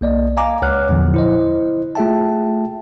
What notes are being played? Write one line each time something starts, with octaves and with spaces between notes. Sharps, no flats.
B1 A#3 D5 D#5
D#5 F5 G#5 A#5 D6
C#2 C#5 F#5 F6 F#6
E2 A#2 D3 F3 F#3
E4 C5 D#5
A3 F4 G#4 E5 G5 A5